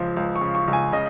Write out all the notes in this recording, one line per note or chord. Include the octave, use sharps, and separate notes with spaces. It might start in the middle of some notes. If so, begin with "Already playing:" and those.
Already playing: C#2 C#3 F3
C#2
C#6
C#3
C#6
C#2
G#5
C#3 D#5